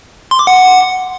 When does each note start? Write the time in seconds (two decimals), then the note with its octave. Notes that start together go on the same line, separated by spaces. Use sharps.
0.31 C6
0.39 D6
0.47 F#5